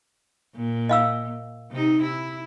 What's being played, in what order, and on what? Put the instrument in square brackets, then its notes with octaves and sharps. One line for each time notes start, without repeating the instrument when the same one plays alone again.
[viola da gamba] A#2
[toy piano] D#5 F5 E6
[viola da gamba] C3 D#4
E4